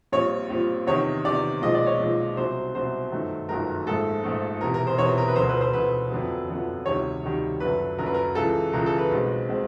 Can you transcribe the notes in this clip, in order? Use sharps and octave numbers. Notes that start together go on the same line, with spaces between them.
A#1 A#2 G3 C4 C#5
A#1 A#2 G3 C4
E2 C3 D#3 C#5
E2 C3 D#3 D5
B1 A#2 F3 G#3 D#5
D5
C#5
B1 A#2 F3 G#3
C2 B2 F#3 C5
C2 B2 F#3 C5
G1 F#2 D#3 F#3 A3
G1 F#2 D#3 F#3 A3 A#4
A#1 G#2 F3 A3 A4
A#1 G#2 F3 A3
E1 E2 C3 E3 A#4
A#4
C5
E1 E2 C3 E3 C#5
A#4
B4
E1 D2 D3 C5
B4
C5
E1 D2 D3 B4
F#1 F2 D3 F#3 B3
F#1 F2 D3 F#3 B3
D2 C3 D#3 G3 C#5
D2 C3 D#3 G3
F#1 F#2 D3 F#3 B4
F#1 F#2 D3 F#3 A#4
B4
A#4
C#2 C#3 E3 A4
C#2 C#3 E3 A#4
A4
B4
B1 B2 G#3 C4
B2 G#3 C4